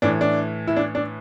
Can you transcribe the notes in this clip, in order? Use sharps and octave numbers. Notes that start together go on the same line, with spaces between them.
A2 E3 D4
D4
E4
D4
D4